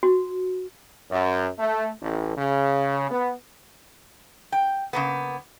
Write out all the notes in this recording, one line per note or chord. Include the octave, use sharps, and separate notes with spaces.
F#4
F#2
A3
A1
C#3
B3
G5
C#3 A#3 B3